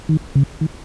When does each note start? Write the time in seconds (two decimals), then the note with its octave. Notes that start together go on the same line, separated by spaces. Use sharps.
0.09 D#3
0.35 C#3
0.61 D#3